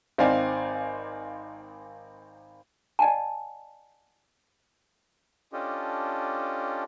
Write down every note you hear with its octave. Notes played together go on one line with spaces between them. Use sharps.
G#1 C4 D#4 D5 F5 G#5
D5 D#5 F#5 G#5 A5
C#4 D4 F4 G4 A4 D#5